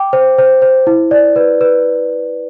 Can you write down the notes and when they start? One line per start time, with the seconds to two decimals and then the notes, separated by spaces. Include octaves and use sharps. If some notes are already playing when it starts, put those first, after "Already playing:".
Already playing: G5 D6
0.13 C5
0.38 C5
0.62 C5
0.87 E4
1.11 D5
1.36 B4
1.61 B4